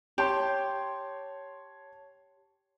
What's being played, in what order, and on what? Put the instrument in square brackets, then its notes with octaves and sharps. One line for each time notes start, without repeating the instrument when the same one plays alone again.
[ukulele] G4 [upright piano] C#5 A5 C6